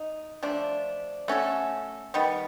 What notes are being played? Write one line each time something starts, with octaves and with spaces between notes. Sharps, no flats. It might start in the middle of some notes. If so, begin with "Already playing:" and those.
Already playing: D#4
F3 A3 D4
A3 C#4 F#4 A4
D#3 G3 B3